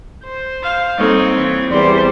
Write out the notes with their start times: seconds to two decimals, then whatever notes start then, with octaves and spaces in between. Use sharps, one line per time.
0.24 C5
0.62 F5
0.98 G3 A#3 C4 D#4 A4 C#5
1.35 E3
1.71 E2 G3 C5 D5 C6